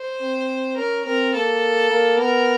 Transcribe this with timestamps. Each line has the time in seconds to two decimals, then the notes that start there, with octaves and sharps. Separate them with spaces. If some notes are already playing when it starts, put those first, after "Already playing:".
Already playing: C5
0.21 C4
0.77 C#4 A#4
1.06 C4 A#4
1.35 A#3 A4
1.91 A#3
2.19 B3 A#4